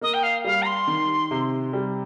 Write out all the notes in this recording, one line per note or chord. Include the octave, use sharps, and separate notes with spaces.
A#3 D#5
G5
F5
G3 F5
A#5
C6
D#3
C3
G3